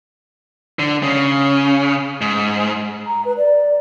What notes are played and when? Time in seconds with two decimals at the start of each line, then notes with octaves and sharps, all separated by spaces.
0.79 D3
1.03 C#3
2.21 G#2
3.07 A#5
3.25 B4
3.37 D5